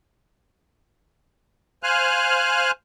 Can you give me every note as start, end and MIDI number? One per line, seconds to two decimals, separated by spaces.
1.83 2.71 72
1.83 2.71 77
1.83 2.71 80
1.83 2.71 89
1.83 2.71 90